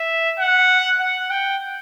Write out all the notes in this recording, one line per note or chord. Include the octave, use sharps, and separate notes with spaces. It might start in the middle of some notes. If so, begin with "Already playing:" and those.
Already playing: E5
F#5
F#5
G5